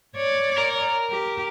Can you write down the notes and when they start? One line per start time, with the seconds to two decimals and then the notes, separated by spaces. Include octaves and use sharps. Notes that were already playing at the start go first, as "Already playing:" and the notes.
0.16 C#5 D5
0.58 A#4
1.10 G4